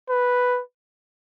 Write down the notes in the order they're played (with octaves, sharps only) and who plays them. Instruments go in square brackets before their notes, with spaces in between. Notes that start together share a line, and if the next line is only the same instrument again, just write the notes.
[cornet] B4